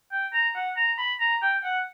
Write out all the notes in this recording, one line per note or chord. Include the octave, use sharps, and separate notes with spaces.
G5
A#5
F#5
A#5
B5
A#5
G5
F#5